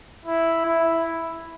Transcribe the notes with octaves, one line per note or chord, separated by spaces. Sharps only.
E4
E4